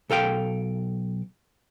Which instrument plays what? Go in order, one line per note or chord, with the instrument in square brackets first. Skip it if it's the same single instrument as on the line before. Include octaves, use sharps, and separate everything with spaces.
[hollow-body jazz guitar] B1 A4 F5 G5